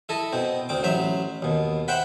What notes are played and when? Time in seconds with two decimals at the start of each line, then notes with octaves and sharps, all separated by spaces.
0.09 E4 A4 D#5
0.33 B2 C4
0.69 D2 C4 D6
0.83 A1 F#3 C5 E5
1.42 D#2 B2
1.88 C5 E5 F#5 G5 B5